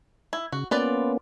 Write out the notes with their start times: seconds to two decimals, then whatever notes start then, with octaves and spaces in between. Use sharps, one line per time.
0.33 E4
0.52 C#3 F#4
0.71 A#3 B3 C#4 F4 B4 D5